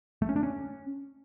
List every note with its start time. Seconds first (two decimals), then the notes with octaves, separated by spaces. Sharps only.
0.22 A3
0.29 C#4
0.36 D4
0.43 C#4